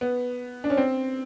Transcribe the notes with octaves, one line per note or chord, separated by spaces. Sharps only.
B3
D4
C#4
C4